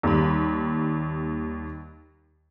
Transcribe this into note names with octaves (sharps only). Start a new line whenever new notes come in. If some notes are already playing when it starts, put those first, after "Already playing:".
D#2 G3 B5